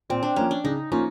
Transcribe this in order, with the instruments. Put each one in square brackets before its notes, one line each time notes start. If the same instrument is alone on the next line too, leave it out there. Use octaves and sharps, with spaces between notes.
[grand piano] A#2 [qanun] C4
[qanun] D4
[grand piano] F3 A#3 [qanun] C#4
[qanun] D4
[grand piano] C#3 [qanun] D#4
[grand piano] F3 A#3 C#4 F4 [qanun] D#4